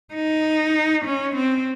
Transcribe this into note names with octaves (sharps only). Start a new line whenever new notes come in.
D#4
C#4
C4